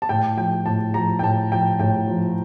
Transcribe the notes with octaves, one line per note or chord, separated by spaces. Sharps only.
A5
A2 G5
F3 G5
A2 A5
F3 A#5
G5
A2 A5
F3 G5
A2 G5
F3